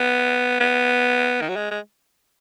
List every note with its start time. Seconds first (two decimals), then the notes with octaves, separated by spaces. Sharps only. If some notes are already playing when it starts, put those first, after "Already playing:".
Already playing: B3
0.60 B3
1.41 D#3
1.49 F#3
1.56 G#3
1.71 G#3